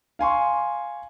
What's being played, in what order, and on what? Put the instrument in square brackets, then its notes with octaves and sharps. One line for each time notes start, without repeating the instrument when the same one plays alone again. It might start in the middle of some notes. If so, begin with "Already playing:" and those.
[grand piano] F5 G#5 C6 C#6